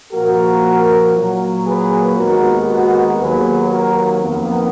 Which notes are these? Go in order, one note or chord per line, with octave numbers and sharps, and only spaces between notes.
A#2 F3 A#3 F#4 A#4
A#2 F#3 A#3
G#4 B4
D#2 D#3 G#3 B3 F#4 A#4
F#4 A#4
D#2 D#3 F#3 A#3 G#4 B4
F#4 A#4
F2 D#3 A#3 B3